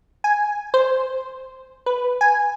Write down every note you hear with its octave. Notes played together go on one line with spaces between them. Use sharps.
G#5
C5
B4
G#5